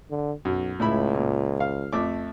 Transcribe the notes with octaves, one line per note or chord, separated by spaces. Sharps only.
D3
B1 F#2
C#2 A2 E4 B5
A#2
F5
F2 A3 D6